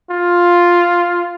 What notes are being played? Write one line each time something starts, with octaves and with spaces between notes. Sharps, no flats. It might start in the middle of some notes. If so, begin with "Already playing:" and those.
F4